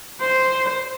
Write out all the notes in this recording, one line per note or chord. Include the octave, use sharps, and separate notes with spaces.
C5